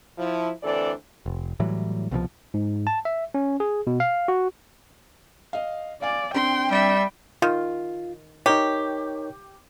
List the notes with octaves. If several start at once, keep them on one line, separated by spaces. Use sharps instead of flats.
F3 E4
D2 E3 C4 D4 A4 D5
F1
A2 E3 F#3 G3
C2 B2 D3 F3
G#2
A5
E5
C#4
G#4
B2
F5
F#4
D#5 F5
D5 F5 G#5
C4 D4 G5 C6
G3 E5
D#3 F4
D#4 G4 A#4 C#5